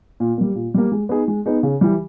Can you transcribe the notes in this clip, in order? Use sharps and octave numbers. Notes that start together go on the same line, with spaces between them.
A#2
G3 A#3
A#2
G3 A#3
G#3
B3 D#4 G#4
G#3
B3 D#4 G#4
C#3
E3 G3